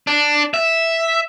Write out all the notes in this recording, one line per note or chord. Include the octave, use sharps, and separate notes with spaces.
D4
E5